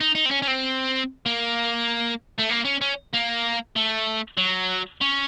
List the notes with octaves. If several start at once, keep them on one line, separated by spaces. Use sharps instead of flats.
D#4
D#4
C4
C#4
C#4
C4
A#3
A3
A#3
C#4
C#4
A#3
A3
F#3
C#4